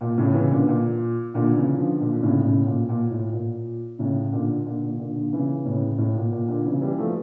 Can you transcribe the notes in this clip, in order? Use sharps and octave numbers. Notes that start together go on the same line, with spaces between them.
A#2
A2 C#3
C#3 E3
A#2 D3
A#2
A#2 D3
C#3 E3
D3 F3
A#2 D3
D3
A2 C#3
A2 C#3
A#2
A#2
A2
A#2
A2 C#3
A#2 D3
A#2 D3
A#2
A#2 D3
A#2 D3
C#3 E3
A2 C#3
A2
A#2
A#2
A#2 D3
C#3 E3
E3 G3
F3 A3